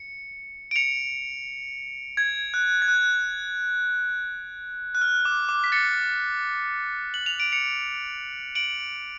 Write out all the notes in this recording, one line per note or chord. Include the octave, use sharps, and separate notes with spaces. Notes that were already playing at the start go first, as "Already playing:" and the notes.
Already playing: C#7
D7
C#7 F7
G#6
F#6
G#6
F#6
F#6
F6
D6
D6
B6
A6 C#7
F#7
F7
D7
C#7 F7
D7 F#7